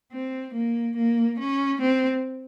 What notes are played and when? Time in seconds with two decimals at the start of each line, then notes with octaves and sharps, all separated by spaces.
0.12 C4
0.55 A#3
0.97 A#3
1.39 C#4
1.82 C4